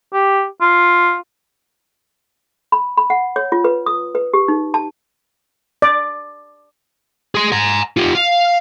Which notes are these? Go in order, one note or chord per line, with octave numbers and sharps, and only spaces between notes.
G4
F4
B5
B5
F#5
C#5
F4
B4
D#6
B4
G4
D#4
A5
D5
G#4 C6
G#5 A#5
F4 G4
F5